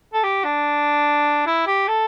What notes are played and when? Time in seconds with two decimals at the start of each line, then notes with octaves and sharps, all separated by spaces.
0.13 A4
0.23 G4
0.44 D4
1.46 E4
1.67 G4
1.88 A4